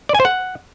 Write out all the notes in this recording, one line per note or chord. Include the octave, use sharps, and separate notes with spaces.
D5
G#5
C5
F#5